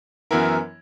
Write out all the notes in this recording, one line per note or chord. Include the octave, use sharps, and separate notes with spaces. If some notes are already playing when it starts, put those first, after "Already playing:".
F#2 E3 B3 E4 A#4